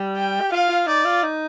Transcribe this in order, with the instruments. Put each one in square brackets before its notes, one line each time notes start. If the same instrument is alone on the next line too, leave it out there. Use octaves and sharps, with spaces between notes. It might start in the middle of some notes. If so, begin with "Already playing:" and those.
Already playing: [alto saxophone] G3
[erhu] G5
[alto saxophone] G4
[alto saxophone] F4 [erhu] F5
[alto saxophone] F4
[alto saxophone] D#4 [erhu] D5
[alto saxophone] F4
D#4